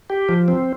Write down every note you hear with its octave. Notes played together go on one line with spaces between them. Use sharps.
G4
F3
C4